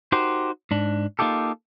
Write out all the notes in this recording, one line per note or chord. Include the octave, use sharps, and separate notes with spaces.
D#4 F#4 G4 A#4 C5
G#2 D4
A#3 D#4 F4 G4 A4